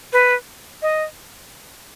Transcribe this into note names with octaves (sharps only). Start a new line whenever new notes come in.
B4
D#5